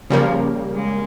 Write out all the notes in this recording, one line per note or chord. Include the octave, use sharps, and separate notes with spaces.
C#3 F3 G3 A#3
G#3